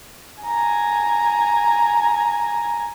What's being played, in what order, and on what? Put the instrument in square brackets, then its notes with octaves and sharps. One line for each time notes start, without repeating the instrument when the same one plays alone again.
[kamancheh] G#5 A#5